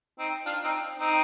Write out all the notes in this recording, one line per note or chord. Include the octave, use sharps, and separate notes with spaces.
C4 D#4
D4 F4
C4 D#4
C4 D#4